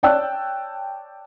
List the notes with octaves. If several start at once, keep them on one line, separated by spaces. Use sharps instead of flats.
C#5 D5 G5 A5 E6 F#6